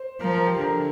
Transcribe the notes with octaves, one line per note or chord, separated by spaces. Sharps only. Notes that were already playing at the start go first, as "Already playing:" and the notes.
Already playing: C5
F3 A#4
A#4
G4
D3 A#4